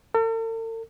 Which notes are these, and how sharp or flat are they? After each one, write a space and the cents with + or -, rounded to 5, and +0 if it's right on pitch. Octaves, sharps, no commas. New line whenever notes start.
A4 +45